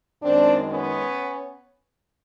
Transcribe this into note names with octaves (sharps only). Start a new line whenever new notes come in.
F#2 D#3 G#3 C4 D4
B3 C#4